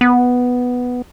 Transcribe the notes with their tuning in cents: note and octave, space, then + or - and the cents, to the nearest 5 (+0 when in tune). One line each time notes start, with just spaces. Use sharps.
B3 +0